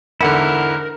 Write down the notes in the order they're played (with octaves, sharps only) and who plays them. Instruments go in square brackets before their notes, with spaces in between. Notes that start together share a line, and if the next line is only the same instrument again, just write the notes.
[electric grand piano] E2 G#2 D3 [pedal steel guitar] E4 F#5 [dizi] A#4